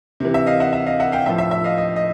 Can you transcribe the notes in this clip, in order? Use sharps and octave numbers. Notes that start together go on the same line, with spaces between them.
C3 E3
E5
D#5 F5
E5 F#5
E5
D#5 F5
E5 F#5
F5 G5
A2 F3 E5
E5
E5
D#5 F5
D#5
D#5